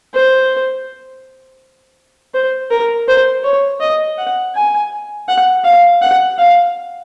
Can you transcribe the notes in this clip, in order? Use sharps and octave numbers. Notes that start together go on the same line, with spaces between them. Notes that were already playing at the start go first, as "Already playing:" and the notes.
C5
C5
A#4
C5
C#5
D#5
F#5
G#5
F#5
F5
F#5
F5